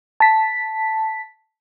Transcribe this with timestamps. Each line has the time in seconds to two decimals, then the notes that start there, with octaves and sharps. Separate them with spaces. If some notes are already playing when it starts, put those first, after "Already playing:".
0.20 A5 B6